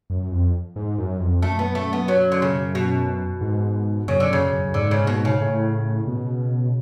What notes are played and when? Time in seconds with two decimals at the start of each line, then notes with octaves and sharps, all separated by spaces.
0.10 F#2
0.32 F2
0.76 G#2
0.98 F#2
1.20 F2
1.42 F#2 A3
1.59 B3
1.75 A3
1.93 B3
2.08 F#3
2.32 D3
2.42 C#3
2.75 B2
3.41 G#2
4.08 F#2 C#3
4.20 D3
4.30 F#2 C#3
4.52 F#2
4.65 F#2
4.74 G#2 D3
4.91 C#3
5.07 B2
5.25 C#3
5.41 A2
6.08 B2